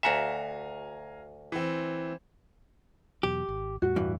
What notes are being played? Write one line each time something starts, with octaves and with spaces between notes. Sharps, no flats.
D2 F#4 E5 F5 G#5 A#5
E3 C4
E2 B2 F#3 G4
G#1
E2 A2 G3 F#4
G2 E3